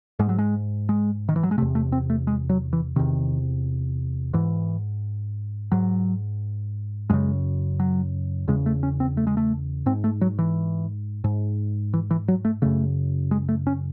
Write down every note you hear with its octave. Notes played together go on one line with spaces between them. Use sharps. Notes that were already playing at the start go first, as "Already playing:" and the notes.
G#2 G#3
F#3
G#3
G#3
D#3
E3
F#3
G#3
E2 C3 A3
A3
C4
A3
G#3
F#3
E3
E2 C3 D#3
G#2 E3
G#2 F#3
F#2 C#3 G#3
F#3
E2 C#3 G#3
A3
C#4
C4
A3
G#3
A3
G#2 C4
A3
F#3
E3
G#2
E3
E3
F#3
A3
F#2 C#3 A3
G#3
A3
C#4